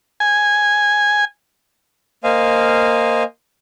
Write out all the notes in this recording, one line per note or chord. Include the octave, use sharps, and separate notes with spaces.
G#5
A#3 C5 D#5 F5 G#5